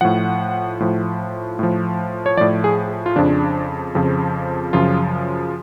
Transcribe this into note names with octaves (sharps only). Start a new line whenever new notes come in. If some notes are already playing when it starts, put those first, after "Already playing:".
A2 F3 F#5
A2 F3
A2 F3
C#5
A2 F3 D5
G#4
F4
F2 C#3 F3 D4
F2 C#3 F3
F#2 C#3 F3 F4